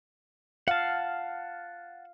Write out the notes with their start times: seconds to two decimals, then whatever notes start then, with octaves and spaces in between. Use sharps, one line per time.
0.68 F5 F#5 A5